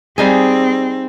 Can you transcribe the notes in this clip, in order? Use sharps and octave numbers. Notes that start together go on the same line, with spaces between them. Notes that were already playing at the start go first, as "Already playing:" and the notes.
G3 C4 D#4 G#4